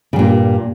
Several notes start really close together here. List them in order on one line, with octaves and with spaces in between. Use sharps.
C#3 G2 A#2